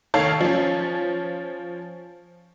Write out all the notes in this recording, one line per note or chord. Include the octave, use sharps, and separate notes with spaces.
D#3 A4 C#5 F5
F3 C#4